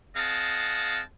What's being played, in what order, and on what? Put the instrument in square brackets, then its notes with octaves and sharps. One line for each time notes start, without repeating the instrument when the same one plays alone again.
[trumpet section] C4 G#4 D#5 F5 F#5 A5